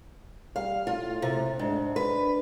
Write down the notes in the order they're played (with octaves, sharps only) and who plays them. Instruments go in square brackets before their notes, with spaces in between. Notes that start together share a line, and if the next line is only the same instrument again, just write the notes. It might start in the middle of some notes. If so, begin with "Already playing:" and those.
[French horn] G3 [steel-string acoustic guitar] F5
[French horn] A2 [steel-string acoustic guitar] F4
[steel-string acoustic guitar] C3
[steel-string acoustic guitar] G#2 [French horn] D4
[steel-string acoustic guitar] B4